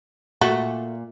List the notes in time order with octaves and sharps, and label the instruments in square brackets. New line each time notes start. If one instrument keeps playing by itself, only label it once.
[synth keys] A#2 [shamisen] A3 F#4